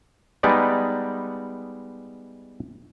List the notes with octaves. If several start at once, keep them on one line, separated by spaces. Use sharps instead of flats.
G3 G#3 B3 D#4 D5